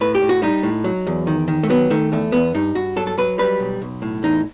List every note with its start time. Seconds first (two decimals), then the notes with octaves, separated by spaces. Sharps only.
0.01 A2 B4
0.15 G4
0.22 A2
0.29 F#4
0.42 G3 D#4
0.63 A2
0.84 F#3
1.07 E2
1.27 D#3
1.48 D#3
1.63 A3
1.69 F#3 B3
1.90 D#3 A3
2.12 E2 A3
2.32 E2 B3
2.55 G2 D#4
2.75 G2 F#4
2.96 F#3 A4
3.07 A4
3.18 F#3 B4
3.38 G3 B4
3.60 B1
3.82 B1
4.02 A2
4.23 E2 D#4